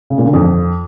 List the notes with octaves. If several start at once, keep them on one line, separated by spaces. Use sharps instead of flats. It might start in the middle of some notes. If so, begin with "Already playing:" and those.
C#3
A#2
D3
F2